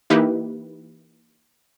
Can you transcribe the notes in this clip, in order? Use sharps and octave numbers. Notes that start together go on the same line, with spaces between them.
E3 A#3 D#4 E4 G4 B4